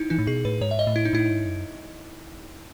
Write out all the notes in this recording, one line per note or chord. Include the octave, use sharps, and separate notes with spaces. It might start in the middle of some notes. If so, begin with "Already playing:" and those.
Already playing: D#4 E4
E3 D#4
A2
B2 G#4
A2 B4
G#2 C#5
E5
D#5
A2
E4
D#4
A2 E4
G#2
F#2